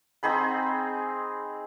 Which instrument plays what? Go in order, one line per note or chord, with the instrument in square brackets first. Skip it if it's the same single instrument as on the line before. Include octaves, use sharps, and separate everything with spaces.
[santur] C4 D#4 G#4 B5